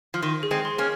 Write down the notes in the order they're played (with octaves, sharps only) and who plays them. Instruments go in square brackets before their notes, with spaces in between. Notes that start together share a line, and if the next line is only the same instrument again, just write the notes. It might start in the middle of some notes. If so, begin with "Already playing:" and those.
[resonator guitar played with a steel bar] F3
[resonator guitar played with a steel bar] D#3 [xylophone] C6
[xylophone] G#4
[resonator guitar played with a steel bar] G#3 C4
[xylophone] C6
[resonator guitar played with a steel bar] A#3 C#4